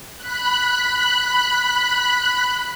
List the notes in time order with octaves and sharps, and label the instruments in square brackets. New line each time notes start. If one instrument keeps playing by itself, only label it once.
[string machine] B5 F#6